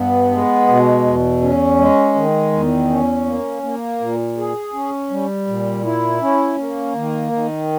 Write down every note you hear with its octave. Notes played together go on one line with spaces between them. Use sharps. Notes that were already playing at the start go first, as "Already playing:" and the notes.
Already playing: G2 B3
G#3
B2
E2
C#4
G#3
D#3
E2
C#4
A#3
A#3
A#2
G#4
C#4
G3
A#2
E4
C#4
A#3
D#3
D#3